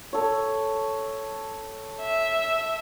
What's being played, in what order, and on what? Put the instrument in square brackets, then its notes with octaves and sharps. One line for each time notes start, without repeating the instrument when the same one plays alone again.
[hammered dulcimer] A4 C#5
[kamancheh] E5